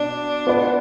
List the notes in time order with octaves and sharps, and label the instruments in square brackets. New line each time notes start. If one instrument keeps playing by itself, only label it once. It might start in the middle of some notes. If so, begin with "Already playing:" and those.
Already playing: [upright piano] B2 [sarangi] D4
[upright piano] B3 F4 B4 D5